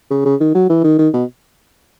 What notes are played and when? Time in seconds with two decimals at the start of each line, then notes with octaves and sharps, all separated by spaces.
0.10 C#3
0.25 C#3
0.40 D#3
0.55 F#3
0.70 E3
0.84 D#3
0.99 D#3
1.14 B2